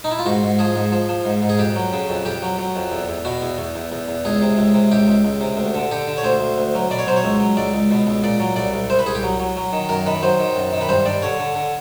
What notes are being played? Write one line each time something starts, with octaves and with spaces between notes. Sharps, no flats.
D#4
E4
F4
G#2 F#4
G#2
F3 G#4
G#2
F3
F3
G#2
G#2
G#4
F2 G4
F#3
C#3
F2
F2 G4
F#3
F#3
F2
E2
E2
B2 F#4
E2
E2
E2
E2
E2
C#2 G#4
C3
C#2
C3
C#2 G4
C#2
C#2
C3
D2
D3
D3 G4
D3
C#5
D2 C5
D2
D2
F#3
B2 D5
C#5
F#3 C5
C#5
C#2
F#3
C#2 D5
C#2
B2
C#2
A#2 D5
F#3
C2 D5
C2
C2 C5
B4
C2 G#4
G4
F#3
F#3
F#3
D#3
F#2 A#4
D#3 B4
F#3 C5
D#3
F#2
D#3
B4
G2 C5
G2 D5
D3 C#5
D3
D3